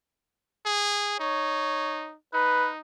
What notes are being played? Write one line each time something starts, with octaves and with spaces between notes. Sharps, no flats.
G#4
D#4 C#5
D#4 B4